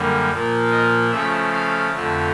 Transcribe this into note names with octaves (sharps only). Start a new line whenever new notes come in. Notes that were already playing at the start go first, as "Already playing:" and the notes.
Already playing: F#2 D3 G3 A#3
A#2 F3 A#3
D#5
C#3 F3 A3 E5
F5
F2 D3 F3 A3